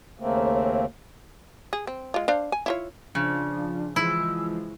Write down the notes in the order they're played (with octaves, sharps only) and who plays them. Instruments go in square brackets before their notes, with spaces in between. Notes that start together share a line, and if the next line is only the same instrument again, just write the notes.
[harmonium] D#2 C#3 A3 A#3 C4
[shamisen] G#4
C4
G#3 F4
D4 C5 F5
G#5
E4 F4 C#5
[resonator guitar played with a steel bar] C#3 [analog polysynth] F3 [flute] D4
[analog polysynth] E3 F3 G#3 [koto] E4 [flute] E6